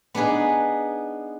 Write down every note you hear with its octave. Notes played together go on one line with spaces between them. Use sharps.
B3 D4 D#4 G#4 B4